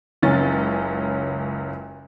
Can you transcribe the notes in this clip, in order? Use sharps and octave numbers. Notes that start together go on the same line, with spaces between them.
F#1 C#2 C#4 A6